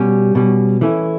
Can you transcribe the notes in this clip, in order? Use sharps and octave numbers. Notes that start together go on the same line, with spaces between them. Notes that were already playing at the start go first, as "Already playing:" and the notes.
Already playing: B2 G3 C#4
B2 G3 C#4
E3 A3 C#4 E4